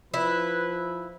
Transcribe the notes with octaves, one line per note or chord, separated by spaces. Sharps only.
F3 E4 B4